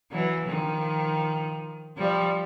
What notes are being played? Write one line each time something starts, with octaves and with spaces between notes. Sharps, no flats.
E3 F#3
D#3 F3
F3 G3